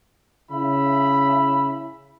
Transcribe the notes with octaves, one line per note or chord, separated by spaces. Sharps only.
C#3 E4 E5 B5